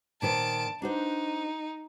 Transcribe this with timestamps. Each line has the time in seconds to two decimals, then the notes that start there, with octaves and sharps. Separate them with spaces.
0.22 A#2 D#3 C5 A5 D7
0.82 D4 D#4 F#4 C5